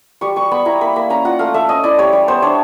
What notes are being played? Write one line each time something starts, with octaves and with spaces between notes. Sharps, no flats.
G3 C#6
G3 C#6
B3 B5
E4 A#5
A#3 B5
A#3 B5
C#4 A#5
F4 F#5
A3 F5
A3 E5
C#4 D#5
E4 D5
G3 C#5
G3
B3 C5
D4 C#5